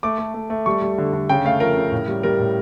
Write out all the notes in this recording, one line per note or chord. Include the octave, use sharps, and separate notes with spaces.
A3 D6
A3
A3
A3
G3 C#6
G3
D3
D3
C#3 G5
A3 F5
F3 A#4
C#3
A2
G3
G3 A#4
A2